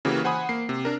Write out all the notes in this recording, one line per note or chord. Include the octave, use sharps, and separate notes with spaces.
C#3 E3 A#3 F#4 G4
C5 F#5 G#5 B5 D#6
A#3 C7
C3
D4 A#4